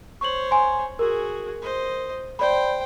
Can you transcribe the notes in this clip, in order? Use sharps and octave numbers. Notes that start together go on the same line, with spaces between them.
C5 C#5 C#6 F#7
G#5 C6
F#4 G#4 A#4
C5 D#5
C5 D5 G5 B5